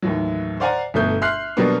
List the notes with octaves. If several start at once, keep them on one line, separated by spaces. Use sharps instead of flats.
D#2 A2 E3 F#3
C5 D5 F5 F#5 G#5 A#5
G1 B2 A3 G6
E5 C6 F6 F#6 C7
B2 F#3 G3 A#3 B3 D4